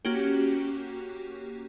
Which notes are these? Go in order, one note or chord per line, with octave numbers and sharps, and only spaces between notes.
A#3 C#4 F#4 G4